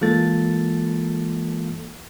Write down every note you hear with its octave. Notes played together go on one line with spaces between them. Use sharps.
E3 G#3 A#3 F4 A4 A6